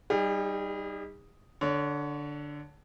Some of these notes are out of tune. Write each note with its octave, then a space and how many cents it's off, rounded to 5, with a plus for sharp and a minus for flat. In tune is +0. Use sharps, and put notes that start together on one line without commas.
G3 +0 D#4 +0 G#4 -45
D3 +0 C#5 +25